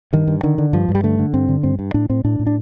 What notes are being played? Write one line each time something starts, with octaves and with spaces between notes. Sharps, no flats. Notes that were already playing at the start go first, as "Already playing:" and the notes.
G2 D#3
G2
D3 D#3
D3
G2 F3
G2
G3
D3 A3
D3
G2 C4
D3
G2 C4
G2
A2 D4
A2 C4
A2 D4
A2
D4